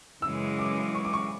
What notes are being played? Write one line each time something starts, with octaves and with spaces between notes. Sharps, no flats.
F#2 C#3 E3 G#3 E6
D6
C#6
D6
C#6